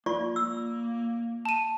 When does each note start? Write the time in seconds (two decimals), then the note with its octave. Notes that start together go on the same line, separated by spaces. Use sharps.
0.06 A#3 F4 D5 C#6
0.36 E6
1.45 A5 D#7